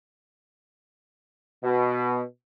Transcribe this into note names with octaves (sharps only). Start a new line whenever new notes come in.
B2